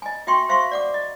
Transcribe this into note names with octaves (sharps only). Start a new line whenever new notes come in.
D#5 G#5
F#4 E5 G5 C6 C#6
C5 E5 F5 C6 C#6
D5 F#5 D6
D#5